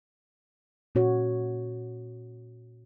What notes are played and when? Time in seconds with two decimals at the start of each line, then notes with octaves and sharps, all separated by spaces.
0.95 A#2 C#4 F#4 C#5